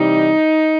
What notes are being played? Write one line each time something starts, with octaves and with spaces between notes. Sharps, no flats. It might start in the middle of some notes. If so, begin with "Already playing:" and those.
Already playing: C3 E3 G3 D#4